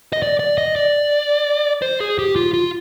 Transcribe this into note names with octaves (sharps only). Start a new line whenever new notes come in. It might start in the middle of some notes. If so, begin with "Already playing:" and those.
D#5
D5
D5
D#5
D5
C5
G#4
G4
F4
F4